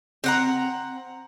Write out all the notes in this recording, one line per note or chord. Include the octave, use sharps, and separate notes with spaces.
C4 F#5 A#5